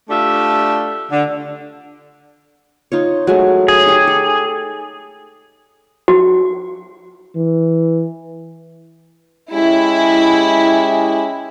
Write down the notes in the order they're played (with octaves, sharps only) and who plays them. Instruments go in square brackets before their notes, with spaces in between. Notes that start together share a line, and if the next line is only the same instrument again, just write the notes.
[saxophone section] A3 D4 F4 G4 E5
D3
[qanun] D#4 F4 C#5
F#3 G#3 A3
[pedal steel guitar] G#4
[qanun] D#4 G4
A4
[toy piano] F#4
[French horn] E3
[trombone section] G#3 C#4 G4 [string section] E4